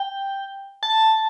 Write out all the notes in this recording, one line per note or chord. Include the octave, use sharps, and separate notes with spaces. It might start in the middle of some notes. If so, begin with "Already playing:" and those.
Already playing: G5
A5